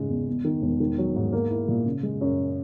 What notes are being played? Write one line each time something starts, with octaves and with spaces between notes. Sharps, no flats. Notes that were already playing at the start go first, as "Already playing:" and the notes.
Already playing: G#2 C#3 G#3
E2
E2
D#3
E1
D#3
F#3
G#2
A#3
E4
A#2
C#3
G#3
F#2